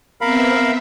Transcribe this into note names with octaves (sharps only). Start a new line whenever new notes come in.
B3 C4 A#4 E5 F5 B5